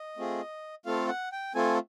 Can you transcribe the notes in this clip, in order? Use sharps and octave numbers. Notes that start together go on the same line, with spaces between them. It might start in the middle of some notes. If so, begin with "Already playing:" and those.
Already playing: D#5
A3 C4 F4 G#4
A3 C4 F4 A4 F5
F#5
G5
A3 C4 F4 A4 G#5